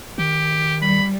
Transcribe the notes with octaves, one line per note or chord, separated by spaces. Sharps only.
D#3 G4
G3 B5